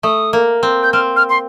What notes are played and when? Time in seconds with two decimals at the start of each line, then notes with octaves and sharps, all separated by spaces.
0.03 A3 D#6
0.33 A#3
0.63 C4
0.83 G6
0.93 C4 F6
1.16 F6
1.30 C6